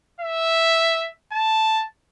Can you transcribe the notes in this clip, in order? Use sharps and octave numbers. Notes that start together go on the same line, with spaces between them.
E5
A5